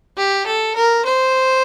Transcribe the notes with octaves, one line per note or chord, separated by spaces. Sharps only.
G4
A4
A#4
C5